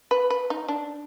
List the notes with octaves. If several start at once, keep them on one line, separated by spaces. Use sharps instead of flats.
B4
B4
D#4
D4